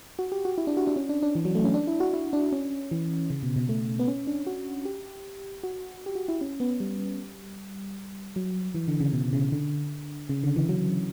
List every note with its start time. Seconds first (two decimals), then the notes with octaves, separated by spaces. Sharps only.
0.19 F#4
0.32 G4
0.45 F#4
0.58 E4
0.67 D4
0.77 F#4
0.87 D4
0.96 C#4
1.09 D4
1.23 D4
1.35 E3
1.45 F#3
1.55 A3
1.64 C#4
1.74 D4
1.87 E4
2.00 F#4
2.13 E4
2.33 D4
2.52 C#4
2.91 E3
3.30 C#3
3.43 B2
3.56 B2
3.69 A3
3.99 B3
4.08 C#4
4.27 D4
4.47 F#4
4.85 G4
5.63 F#4
6.06 G4
6.15 F#4
6.28 E4
6.41 C#4
6.60 B3
6.80 G3
8.36 F#3
8.75 E3
8.88 D3
9.00 C#3
9.13 B2
9.33 C#3
9.52 D3
10.29 C#3
10.43 D3
10.56 E3
10.69 F#3